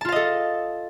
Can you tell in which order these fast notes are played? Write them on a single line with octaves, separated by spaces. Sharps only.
A5 F4 F5 D#5 A4